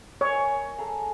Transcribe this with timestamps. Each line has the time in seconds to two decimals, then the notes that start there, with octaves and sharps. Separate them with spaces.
0.21 A#4 C#5 D#5 G#5
0.78 G#4 A4 A#5